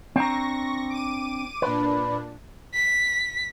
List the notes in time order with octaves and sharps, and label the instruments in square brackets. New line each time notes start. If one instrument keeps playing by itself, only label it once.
[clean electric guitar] C4 D4 A#5 [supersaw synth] C#6 A#6
[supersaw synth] D6 D#7
[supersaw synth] A#2 D4 [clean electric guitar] B4
[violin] B6